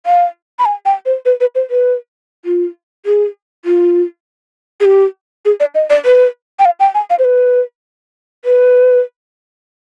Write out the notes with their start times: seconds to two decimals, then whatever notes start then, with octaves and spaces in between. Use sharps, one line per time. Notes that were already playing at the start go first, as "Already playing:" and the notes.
0.06 F5
0.59 B5
0.65 G#5
0.85 G5
1.06 C5
1.25 B4
1.40 B4
1.55 C5
1.70 B4
2.45 F4
3.06 G#4
3.65 F4
4.80 G#4
4.85 G4
5.45 G#4
5.60 D5
5.75 D#5
5.90 D5
6.05 B4
6.59 G5
6.65 F5
6.80 G5
6.94 G#5
7.10 F5
7.19 C5
7.24 B4
8.45 B4